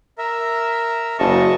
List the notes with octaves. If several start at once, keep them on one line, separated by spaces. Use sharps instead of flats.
A#4 E5
F#1 D#5 A5 C#6